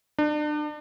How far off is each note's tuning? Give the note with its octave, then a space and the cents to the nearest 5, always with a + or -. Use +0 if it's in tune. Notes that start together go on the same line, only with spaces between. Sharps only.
D4 +35